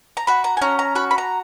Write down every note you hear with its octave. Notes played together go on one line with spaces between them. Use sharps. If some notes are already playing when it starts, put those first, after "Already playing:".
A#5
F#4 B5
A#5
G#5
C#4 A#5
A#5
F#4 B5
B5
A#5